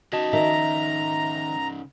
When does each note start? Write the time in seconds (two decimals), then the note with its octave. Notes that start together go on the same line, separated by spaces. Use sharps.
0.13 C#3 D#4 F#4 D#5 A5
0.33 D#3 E5 A#5